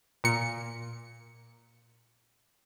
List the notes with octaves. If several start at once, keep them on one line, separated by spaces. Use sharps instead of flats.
A#2 C#7